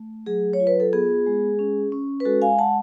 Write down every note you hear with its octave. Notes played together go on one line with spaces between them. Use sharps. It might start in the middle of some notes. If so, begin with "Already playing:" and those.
Already playing: A3
F#3 G#4
C#5
F4
B4
A4
B3 G#4
G#3
C#4
C#4
B4
G#3 F#4 A4
F5 G#5
G#3 F#5 A5